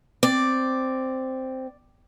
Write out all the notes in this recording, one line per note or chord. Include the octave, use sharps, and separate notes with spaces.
C4 D5